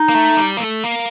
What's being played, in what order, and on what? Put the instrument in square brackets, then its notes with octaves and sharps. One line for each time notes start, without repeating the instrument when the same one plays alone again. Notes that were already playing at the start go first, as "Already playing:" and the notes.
Already playing: [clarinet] D#4
[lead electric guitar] A#3
A3
G3
A#3
A3
A#3